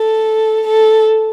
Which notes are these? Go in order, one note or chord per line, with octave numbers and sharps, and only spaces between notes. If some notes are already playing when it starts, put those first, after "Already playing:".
Already playing: A4
A4